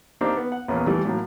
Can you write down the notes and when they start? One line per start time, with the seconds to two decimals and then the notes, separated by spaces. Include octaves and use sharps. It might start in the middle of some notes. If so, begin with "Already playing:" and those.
0.21 A#3 C4 D4 D#4 G4
0.37 B3
0.52 F#5
0.68 A#1 E2 A#3 C#4 B4
0.87 E3 G3 A3
1.05 A2 F#3 A#3